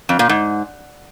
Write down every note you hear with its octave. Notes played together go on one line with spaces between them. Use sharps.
F2
A#2
G#2